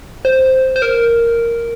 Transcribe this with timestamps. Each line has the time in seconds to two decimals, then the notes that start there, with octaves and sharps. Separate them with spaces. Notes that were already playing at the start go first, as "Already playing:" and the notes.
0.25 C5
0.76 C5
0.82 A#4